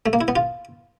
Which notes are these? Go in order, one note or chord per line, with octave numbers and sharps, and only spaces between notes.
A3
A#3
E4
B3
F4